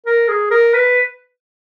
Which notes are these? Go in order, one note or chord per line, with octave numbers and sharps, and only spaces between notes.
A#4
G#4
A#4
B4